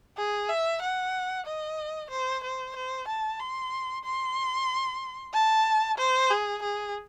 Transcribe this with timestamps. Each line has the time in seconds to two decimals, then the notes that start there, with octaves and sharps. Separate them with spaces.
0.18 G#4
0.50 E5
0.82 F#5
1.47 D#5
2.11 C5
2.44 C5
2.76 C5
3.08 A5
3.40 C6
4.05 C6
5.34 A5
5.98 C5
6.30 G#4
6.63 G#4